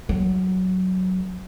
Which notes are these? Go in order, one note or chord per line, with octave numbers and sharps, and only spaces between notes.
F#3